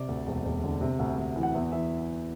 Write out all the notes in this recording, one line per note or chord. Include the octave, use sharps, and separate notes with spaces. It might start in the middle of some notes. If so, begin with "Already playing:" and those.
Already playing: C3 D5
D2
E1
E1
D3
C3
D2
D2
E3
F#5
E2 E5
E3 E5